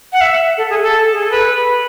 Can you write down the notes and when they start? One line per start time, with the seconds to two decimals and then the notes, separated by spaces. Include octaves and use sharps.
0.13 F#5
0.21 E5
0.58 A4
0.70 G#4
0.83 A4
1.13 G#4
1.23 A4
1.32 B4